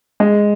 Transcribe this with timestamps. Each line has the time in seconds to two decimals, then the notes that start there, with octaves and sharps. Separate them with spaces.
0.20 G#3